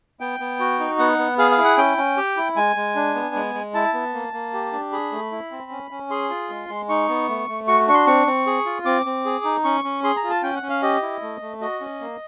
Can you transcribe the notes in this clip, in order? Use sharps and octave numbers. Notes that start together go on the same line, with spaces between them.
B3 G5
B3
F#4
D#4
B3 F#5
B3
G#4 F5
F5
E4
F#5
C#4 G5
C#4
G4
E4
G#3 G#5
G#3
D4
B3
G#3
G#3
E4 A5
B3
A#3
A#3
G4
D4
G#4 B5
A3
E4
C4
C#4
C#4
G#4 C6
F4
G#3
G#3
D#4 C#6
B3
A3
A3
F#4 C#6
D4 C#6
C6
C4 C#6
C4
G#4
F4
C4 D6
C4
G#4
D#4
C#4 C#6
C#4
G#4 C6
A#5
F4
A5
C#4 G5
F#5
C#4
F5
G4 D#5
E4
A3
A3
F#4 D#5
C#4
A#3